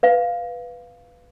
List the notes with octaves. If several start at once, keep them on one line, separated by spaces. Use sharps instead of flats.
B4 F5